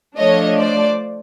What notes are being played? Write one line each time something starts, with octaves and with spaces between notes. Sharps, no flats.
F3 A3 D4 C#5 D#5
C5 D5